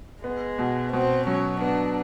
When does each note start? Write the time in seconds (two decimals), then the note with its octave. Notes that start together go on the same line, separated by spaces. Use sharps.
0.24 G#3 B3
0.59 B2
0.92 B2 C4
1.27 F#3 C#4
1.61 B3 D4